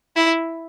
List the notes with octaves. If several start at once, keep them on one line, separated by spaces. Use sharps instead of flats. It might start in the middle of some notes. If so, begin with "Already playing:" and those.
E4